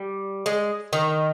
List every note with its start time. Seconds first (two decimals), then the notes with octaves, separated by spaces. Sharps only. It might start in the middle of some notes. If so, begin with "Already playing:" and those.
Already playing: G3
0.46 G#3
0.93 D#3